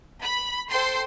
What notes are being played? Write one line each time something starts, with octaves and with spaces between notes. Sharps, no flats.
B5
A4 C5 G5 C6